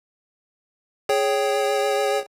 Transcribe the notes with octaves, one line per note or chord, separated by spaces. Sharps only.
G#4 C#5 G5